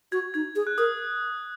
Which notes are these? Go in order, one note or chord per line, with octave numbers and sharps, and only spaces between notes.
F#4 G#6
D#4 G#6
G#4
F#6
A#4 D#6